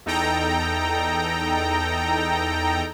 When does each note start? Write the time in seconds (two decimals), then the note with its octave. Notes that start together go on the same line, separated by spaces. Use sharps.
0.06 E2 D#4 A4 G5 A#5